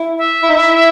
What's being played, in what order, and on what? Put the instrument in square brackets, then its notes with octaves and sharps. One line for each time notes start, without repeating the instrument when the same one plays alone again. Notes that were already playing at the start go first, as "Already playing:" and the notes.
Already playing: [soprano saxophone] E4
[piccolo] E5
[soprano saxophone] E4
D#4
E4